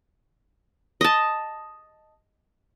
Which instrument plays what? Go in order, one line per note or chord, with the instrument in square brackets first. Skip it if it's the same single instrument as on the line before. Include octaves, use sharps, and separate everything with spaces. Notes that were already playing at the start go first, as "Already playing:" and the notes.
[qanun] D#5 A5